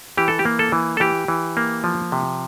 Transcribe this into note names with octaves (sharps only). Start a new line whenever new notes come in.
E3 G4
A4
G4
A#3
A4
E3
A4
E3 G4
E3
A#3
F3
C3